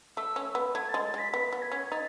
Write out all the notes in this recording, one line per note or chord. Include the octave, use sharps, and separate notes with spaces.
A3 E6
C#4
B3
A3 G#6
A6
G#3
A6
G#3 B6
B3 B6
B3
G#6
C#4
D#4 A6